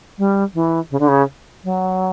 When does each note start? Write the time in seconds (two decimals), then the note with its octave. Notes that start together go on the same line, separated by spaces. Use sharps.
0.18 G3
0.54 E3
0.91 C#3
1.00 D3
1.08 C#3
1.64 F#3